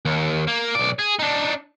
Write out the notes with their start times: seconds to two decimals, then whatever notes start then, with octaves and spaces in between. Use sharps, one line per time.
0.05 D#2
0.48 A#3
0.75 B1 D5
0.99 G#4
1.19 D4 D#4